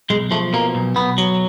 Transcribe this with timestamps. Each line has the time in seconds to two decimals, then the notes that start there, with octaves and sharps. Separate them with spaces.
0.10 B1 G#3
0.31 F3 A3
0.53 B2 A#3
0.75 B1
0.96 B1 B3
1.18 F#3